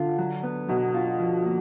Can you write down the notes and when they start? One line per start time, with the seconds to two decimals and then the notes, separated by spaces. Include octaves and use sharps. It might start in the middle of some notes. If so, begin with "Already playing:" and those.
Already playing: D3 F4
0.19 F#3
0.43 B3
0.69 B2 F#3
0.94 F4
1.19 F3
1.45 A#3